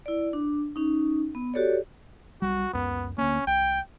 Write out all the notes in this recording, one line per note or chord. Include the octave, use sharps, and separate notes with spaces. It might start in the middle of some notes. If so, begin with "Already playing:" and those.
E4 D5
D4
C#4 D#4
B3
F#4 G4 A4 C#5 D5
B1 G3 F#4
C#2 F#2 B3
D2 A#3 C#4
C2 G5